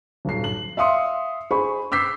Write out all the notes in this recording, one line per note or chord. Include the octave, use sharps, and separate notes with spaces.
D#1 B1 C7
F#7
E5 F5 C6 D#6 C#7
G#4 C5 B5 C#6
D6 E6 G6 B6 C7